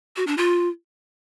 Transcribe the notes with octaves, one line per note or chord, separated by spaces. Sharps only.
F#4
D4
F4